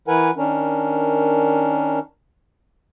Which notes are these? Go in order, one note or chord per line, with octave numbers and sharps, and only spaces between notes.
E3 E4 A#4 B4 F#5 G#5
D#3 C#4 D4 A#4